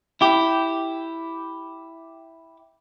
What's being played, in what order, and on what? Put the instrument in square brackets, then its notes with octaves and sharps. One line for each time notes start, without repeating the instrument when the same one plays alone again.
[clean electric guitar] E4 G4